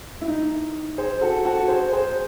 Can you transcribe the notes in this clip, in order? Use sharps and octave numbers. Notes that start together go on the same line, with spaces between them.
E4
D#4
G#4 C5
F#4 A4
F#4 A4
G#4 C5
G#4 C5